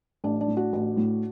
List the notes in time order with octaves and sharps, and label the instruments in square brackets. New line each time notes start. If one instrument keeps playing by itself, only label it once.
[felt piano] A1 D4
D4
A2
D4 F#4
A1
A2